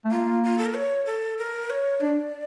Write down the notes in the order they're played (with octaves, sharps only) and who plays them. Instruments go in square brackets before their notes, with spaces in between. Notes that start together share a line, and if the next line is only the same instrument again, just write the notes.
[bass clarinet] A3
[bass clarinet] A#3 [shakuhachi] F4
[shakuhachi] F4
A4
A#4
C#5
A4
A#4
C#5
[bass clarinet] D4 [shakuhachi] D5